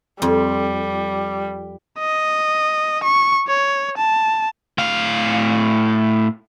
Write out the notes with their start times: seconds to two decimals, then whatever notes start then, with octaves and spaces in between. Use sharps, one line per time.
0.22 F2 G3
1.99 D#5
3.03 C#6
3.47 C#5
3.97 A5
4.78 A2 F5